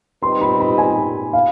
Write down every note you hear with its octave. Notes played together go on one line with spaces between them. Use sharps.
G3 C4 D#4 B4 D#5 C6
B5
B5
G#5
F5